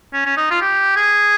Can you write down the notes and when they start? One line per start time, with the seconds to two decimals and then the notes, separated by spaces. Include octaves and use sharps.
0.13 C#4
0.25 C#4
0.37 D#4
0.50 F4
0.61 G4
0.96 G#4